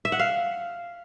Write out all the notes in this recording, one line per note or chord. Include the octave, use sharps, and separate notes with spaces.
E5
F#5
F5